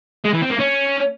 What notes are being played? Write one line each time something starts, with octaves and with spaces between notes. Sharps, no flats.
G#3
E3
C4
A#3
C#4